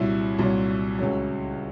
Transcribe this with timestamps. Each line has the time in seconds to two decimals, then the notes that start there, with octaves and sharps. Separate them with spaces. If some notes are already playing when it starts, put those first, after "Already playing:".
Already playing: C2 A#2 F#3 E4
0.39 C2 A#2 F#3
0.99 C#2 C#3 F#3